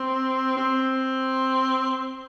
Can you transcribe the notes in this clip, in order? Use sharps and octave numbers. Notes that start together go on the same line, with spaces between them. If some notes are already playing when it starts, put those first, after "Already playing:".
Already playing: C4
C4